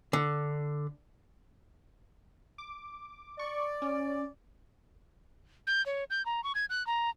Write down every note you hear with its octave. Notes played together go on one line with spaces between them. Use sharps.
D3
D6
D5 C#6
C#4
G6
C#5
G6
A#5
C#6
G#6
F#6
A#5